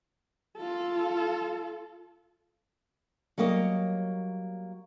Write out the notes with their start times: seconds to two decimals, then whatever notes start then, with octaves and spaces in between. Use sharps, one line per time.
0.57 F4 A4
3.38 F#3 G3 A#3 C#5 D#5